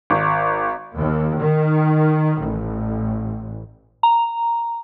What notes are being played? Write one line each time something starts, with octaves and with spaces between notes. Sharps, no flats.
G#1
D#2
D#3
A1
A#5